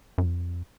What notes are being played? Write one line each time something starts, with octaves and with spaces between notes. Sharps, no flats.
F#2
F2